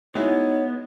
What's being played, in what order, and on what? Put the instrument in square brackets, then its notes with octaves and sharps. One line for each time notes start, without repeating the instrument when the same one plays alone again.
[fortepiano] G#3 E4 F#4 [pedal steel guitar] B3 [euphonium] D#4 [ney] C#5